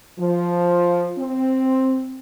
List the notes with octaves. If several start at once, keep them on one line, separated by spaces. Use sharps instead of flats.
F3
C4